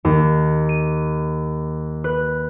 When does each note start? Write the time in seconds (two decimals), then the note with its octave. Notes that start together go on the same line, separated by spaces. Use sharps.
0.05 D#2
0.69 D#7
2.04 B4